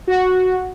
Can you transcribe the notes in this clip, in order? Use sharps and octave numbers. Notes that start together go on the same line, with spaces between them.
F#4